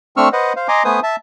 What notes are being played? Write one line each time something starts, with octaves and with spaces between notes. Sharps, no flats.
A3 C4 D4 C#6 E6 F6
B4 C5 D#5 F#5
C5 F5
D#5 G#5 A#5 C6 D6
A3 B3 B4 C5 G#5 D#6
E5 A5